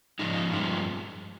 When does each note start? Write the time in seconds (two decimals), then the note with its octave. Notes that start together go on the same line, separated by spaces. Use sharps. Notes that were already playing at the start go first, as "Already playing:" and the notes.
0.19 G#2 F3 G#3 D#4
0.52 G2 F3 G#3